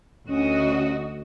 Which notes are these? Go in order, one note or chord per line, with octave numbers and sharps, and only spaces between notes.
D2 C#4 F#4 D#5